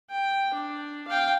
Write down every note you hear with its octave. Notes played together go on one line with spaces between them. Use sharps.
G5
D4
F5 G5